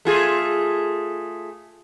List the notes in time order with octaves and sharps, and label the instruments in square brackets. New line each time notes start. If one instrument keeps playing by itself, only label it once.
[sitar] A3 F4 G#4